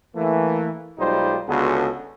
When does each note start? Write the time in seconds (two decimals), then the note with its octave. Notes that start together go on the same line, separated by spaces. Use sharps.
0.16 E3 A3 A#3
0.99 B1 G3 G#3 D#4 F4 C5
1.49 C#2 D3 B3 F#4 G#4 A4